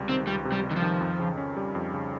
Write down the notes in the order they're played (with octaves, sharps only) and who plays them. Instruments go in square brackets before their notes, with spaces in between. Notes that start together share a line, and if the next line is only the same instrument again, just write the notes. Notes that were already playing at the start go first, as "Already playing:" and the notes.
Already playing: [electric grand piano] C#2 C3 G3
[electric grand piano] D#3 [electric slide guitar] C4
[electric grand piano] C#2 [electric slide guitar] G3
[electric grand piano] C3
[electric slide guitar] G3
[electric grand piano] G3
[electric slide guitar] D#3
F3
[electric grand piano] D#3
F2
C#3
C#4
G3
F2
C#3